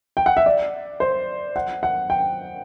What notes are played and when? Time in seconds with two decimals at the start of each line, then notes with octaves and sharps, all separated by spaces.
0.17 G5
0.26 F#5
0.37 E5
0.46 D5
1.00 C5
1.56 F#5
1.83 F#5
2.10 G5